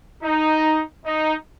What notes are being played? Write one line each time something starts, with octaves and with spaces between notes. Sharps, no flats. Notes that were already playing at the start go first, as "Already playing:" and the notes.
D#4
D#4